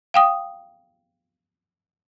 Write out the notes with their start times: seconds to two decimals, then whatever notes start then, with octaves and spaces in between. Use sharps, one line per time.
0.14 F5 G5 D#6